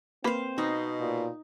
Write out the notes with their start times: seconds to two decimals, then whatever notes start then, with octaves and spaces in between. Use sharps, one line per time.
0.24 A#3 C4 B4 C5 F5
0.58 B2 D#4
1.00 A#2